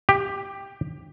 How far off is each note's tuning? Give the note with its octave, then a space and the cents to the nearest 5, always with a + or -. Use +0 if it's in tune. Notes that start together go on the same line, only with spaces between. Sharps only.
G4 +10